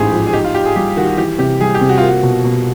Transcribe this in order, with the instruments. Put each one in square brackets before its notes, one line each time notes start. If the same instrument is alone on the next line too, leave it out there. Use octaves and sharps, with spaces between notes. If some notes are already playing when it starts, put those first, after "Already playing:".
Already playing: [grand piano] A1 G#2 A3 [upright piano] G4 G#4
[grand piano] F3
[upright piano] G#4
[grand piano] D#4 [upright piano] G4
[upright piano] F4
[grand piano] D#4 [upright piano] G4
[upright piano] G#4
[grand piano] G3 [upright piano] G4
[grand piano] D#3 [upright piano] F#4
[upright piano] F#4
[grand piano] E3 [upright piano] G4
[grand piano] C3 [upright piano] G4
[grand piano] G3 [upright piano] G#4
[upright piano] G4
[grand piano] C3
[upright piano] F#4
F4
[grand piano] A#3 [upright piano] F#4
[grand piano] B2
B2